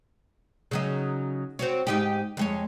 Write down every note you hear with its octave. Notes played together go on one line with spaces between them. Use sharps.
C#3 F#3 D#4
C4 F#4 C#5
G#2 D#4 G4
F2 G#3 C#5